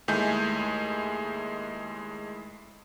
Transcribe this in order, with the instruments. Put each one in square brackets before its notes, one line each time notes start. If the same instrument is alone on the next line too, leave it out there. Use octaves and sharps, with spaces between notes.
[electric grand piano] D#2 G#3 A3 E4 G#5 G6